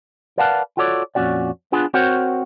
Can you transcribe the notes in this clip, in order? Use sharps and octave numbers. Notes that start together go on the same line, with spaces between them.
A#4 B4 D5 F5 F#5 A5
F4 F#4 A4 C#5 D5
F2 A#2 C4 C#4 F#4 D5
B3 D4 F4 G#4
C4 F#4 A#4 C5 C#5 F#5